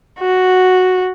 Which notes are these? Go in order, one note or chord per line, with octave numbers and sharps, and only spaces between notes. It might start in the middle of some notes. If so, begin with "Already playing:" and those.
F#4